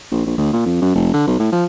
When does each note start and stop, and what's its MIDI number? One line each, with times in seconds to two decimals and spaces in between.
0.12 0.21 34
0.26 0.37 34
0.38 0.49 38
0.53 0.65 46
0.66 0.78 41
0.82 0.95 42
0.95 1.09 29
1.13 1.23 50
1.27 1.38 35
1.40 1.49 45
1.52 1.65 53